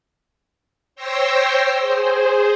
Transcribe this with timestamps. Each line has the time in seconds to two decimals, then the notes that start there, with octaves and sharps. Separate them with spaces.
0.96 C5 C#5 G5 E6 A#6 C7
1.80 G#4 C5